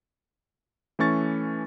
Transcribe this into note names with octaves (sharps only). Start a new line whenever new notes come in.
E3 A3 C#4 C#6 A6